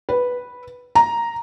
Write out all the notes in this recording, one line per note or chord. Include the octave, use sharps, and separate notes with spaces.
B4
A#5